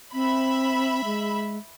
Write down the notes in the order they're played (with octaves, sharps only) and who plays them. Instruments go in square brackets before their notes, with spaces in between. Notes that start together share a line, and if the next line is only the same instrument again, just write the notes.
[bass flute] C4 [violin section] E5 B5
[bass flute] G#3